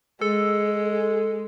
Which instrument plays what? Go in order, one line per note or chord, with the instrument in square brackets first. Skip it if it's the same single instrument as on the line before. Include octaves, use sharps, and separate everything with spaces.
[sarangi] G#3 [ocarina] G#4 [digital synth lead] A4